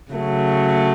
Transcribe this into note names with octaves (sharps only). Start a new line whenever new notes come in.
C#3 F#3 A3